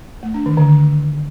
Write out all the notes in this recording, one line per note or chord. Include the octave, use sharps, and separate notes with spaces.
A3
D4
D#3
D3